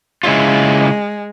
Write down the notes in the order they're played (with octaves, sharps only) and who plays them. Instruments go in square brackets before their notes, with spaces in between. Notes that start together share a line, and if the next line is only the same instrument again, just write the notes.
[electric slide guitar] C#3 E4 F4 [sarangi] G#3